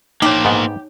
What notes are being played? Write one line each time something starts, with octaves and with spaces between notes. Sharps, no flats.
A#3 D#4 G4 C5 C#5
G#2 B3